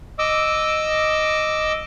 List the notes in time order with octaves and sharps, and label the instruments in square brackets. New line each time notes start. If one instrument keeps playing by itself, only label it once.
[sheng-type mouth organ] D#5 D6 E6